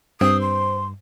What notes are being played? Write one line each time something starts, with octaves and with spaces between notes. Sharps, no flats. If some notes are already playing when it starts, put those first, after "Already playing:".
G2 C4 D#6
C6